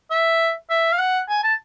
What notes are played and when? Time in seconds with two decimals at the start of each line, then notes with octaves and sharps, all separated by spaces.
0.10 E5
0.70 E5
0.92 F5
0.99 F#5
1.29 G#5
1.44 A5